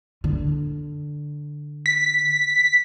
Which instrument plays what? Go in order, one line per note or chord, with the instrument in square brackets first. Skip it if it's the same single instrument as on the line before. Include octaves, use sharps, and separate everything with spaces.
[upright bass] D3
[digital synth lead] B6